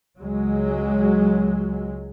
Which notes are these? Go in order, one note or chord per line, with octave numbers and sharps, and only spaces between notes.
C#2 F#3 G#3